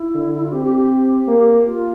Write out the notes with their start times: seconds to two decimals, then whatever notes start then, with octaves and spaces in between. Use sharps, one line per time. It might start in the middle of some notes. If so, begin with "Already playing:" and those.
Already playing: E4
0.15 D3
0.35 E4
0.44 F4
0.52 C4 G4
0.65 G4
0.78 G4
1.28 A#3
1.66 F4